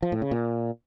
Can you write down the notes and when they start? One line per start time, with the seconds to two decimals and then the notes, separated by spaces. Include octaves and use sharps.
0.03 F3
0.12 A2
0.22 C#3
0.31 A#2